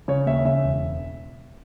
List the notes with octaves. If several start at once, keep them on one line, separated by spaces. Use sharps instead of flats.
C#3 C#5
D#2 E5
C#3 E5
E1